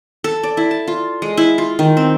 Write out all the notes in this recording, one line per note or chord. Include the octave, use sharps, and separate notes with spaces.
A4
D5
E4
A5
F4
G#3
E4
F4
D#3
C4